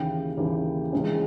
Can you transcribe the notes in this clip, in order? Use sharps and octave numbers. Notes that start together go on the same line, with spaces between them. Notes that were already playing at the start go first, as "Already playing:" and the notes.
Already playing: D#2 C#3 E3 G5
D#2 C#3 E3
C#2 C#3 E3 G#3 C#4